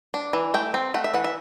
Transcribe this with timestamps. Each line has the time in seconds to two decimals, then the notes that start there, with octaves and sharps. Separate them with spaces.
0.14 D4
0.33 E3
0.54 A3 G5
0.74 C4
0.94 A3 F#5
1.04 E5
1.14 E3 F#5
1.24 E5